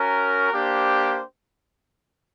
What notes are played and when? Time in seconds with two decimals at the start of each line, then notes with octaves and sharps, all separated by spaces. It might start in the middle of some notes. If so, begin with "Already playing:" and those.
Already playing: C#4 F#4 A#4
0.52 A#3 D4 G4 C5